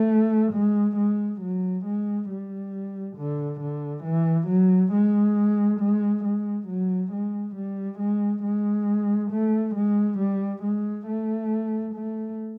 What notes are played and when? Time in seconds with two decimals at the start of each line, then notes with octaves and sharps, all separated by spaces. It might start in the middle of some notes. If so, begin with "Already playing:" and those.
Already playing: A3
0.53 G#3
0.97 G#3
1.41 F#3
1.85 G#3
2.29 G3
3.17 D3
3.60 D3
4.04 E3
4.48 F#3
4.92 G#3
5.80 G#3
6.24 G#3
6.68 F#3
7.12 G#3
7.56 G3
7.99 G#3
8.43 G#3
9.32 A3
9.75 G#3
10.18 G3
10.63 G#3
11.07 A3
11.95 A3